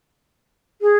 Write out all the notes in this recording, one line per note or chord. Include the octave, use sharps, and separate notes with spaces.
G#4